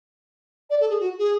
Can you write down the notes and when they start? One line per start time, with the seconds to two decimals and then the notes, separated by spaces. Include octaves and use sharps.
0.70 D5
0.80 A4
0.89 G#4
1.00 F#4
1.18 G#4